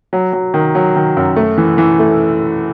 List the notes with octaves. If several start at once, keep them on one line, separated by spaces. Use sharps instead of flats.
F#3
F#3
D#3
F#3
D#3
F#2
A3
E3
E3
A3